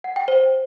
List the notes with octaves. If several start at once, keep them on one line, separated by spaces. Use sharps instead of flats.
F#5
G5
C5